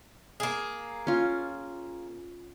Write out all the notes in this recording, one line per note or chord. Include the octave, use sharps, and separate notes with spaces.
A#3 G#4
C#4 F4